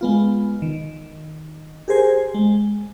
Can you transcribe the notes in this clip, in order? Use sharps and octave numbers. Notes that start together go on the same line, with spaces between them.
G#3 B3 F4
D#3
G4 G#4 A#4 C5 G#5
G#3